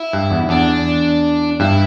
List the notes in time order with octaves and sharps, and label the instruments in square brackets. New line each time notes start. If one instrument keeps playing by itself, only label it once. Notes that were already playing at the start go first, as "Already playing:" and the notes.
Already playing: [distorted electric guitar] E4
[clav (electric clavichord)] G2
E2
[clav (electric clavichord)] E2 [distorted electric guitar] D4
[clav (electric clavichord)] G2 [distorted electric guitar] E4